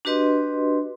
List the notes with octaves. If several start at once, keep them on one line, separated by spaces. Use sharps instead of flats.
D4 F#4 G4 B4 D#5 C6